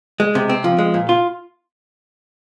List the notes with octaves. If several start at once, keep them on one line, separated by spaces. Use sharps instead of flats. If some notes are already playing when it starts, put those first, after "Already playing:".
G#3
C3
C4
F3
G#3
A#2
F4